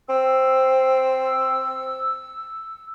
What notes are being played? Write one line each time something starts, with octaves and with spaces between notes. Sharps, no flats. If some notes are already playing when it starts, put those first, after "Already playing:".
C4 E6